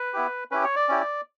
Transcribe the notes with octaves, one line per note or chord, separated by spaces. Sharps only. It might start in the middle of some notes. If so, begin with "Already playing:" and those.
Already playing: B4
B3 E4 G4
C#4 E4 G4 B4
C#5
D5
C#4 E4 G4